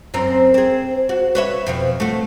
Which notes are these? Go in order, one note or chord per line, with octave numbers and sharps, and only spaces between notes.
F#2 C4 A#4
C4 G#4
F#4
B4 C#5 E5
F2 B2 F3
A3 F#4